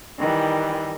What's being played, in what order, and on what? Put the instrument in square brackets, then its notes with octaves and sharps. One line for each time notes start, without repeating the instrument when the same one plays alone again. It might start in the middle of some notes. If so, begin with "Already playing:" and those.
[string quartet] D#3 E3 G3